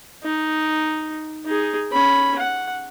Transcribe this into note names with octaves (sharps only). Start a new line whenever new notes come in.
D#4
D#4 G#4
C#4 B5
F#5